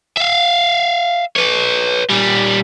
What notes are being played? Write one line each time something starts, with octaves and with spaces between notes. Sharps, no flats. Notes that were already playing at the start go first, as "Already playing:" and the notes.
E5 F5
B4 C#5
A#2 G3